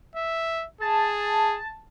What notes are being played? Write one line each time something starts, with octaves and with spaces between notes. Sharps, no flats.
E5
G#4 A5